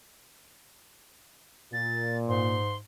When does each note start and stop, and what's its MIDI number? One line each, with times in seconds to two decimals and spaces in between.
1.73 2.57 46
1.73 2.17 93
2.28 2.80 44
2.28 2.76 84